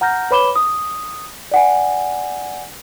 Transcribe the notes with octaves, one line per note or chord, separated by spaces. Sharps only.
F#5 A#5 F6 G6 A#6
B4 C#5 B5 D6 E7 G7
D#6
D5 F#5 G#5